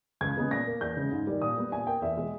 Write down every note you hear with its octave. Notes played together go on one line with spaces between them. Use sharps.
C#2 G#6
C#3 G#3 B3
A#2 A#6
A#3
E2 G6
C#3 G#3
G#2
D#3 G3
A#2 D#6
G3 B3
A#2 G#5
A#3 G5
E2 E5
B2 G#3